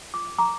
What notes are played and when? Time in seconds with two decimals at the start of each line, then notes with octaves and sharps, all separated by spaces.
0.14 F4 D6
0.39 A#5 D6